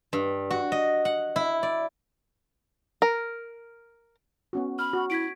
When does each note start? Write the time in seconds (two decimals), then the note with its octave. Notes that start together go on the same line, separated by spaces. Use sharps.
0.13 G2
0.50 F#4
0.72 D#5
1.05 F#5
1.36 E4
1.63 D5
3.02 A#4
4.53 B3 C#4 F#4
4.79 B5 F6
4.93 F#4
5.10 E4 G#6 B6 D7